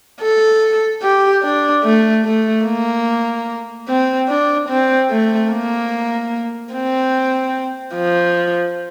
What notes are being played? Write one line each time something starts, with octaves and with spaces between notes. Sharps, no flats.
A4
G4
D4
A3
A3
A#3
C4
D4
C4
A3
A#3
C4
F3